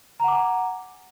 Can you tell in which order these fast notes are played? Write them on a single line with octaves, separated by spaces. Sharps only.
A#5 F#5 D6 G#5